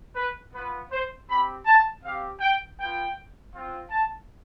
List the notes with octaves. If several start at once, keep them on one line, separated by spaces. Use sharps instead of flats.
B4
B3 F4 B4
C5
C4 G4 B5
A5
C4 G4 F5
G5
B3 F4 G5
C4 F4
A5